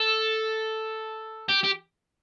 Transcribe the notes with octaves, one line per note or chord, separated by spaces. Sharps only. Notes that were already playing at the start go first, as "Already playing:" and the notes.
Already playing: A4
G4
G4